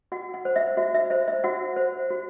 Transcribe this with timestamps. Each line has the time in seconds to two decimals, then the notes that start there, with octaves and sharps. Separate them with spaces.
0.12 F#4 F#5
0.34 F#5
0.45 C5
0.56 E5
0.77 F#4 E5
0.94 E5
1.10 C5 E5
1.28 E5
1.44 F#4 F#5
1.76 C5
2.10 F#4